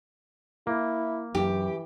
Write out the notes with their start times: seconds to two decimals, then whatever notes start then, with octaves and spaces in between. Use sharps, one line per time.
0.67 A#3 E4
1.35 F#2 E3 G4